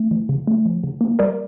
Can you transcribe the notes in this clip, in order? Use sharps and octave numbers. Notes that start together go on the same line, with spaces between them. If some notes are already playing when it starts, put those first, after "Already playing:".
Already playing: A3
E3
C#3
A3
F3
C#3
A#3
G3 A#4 D5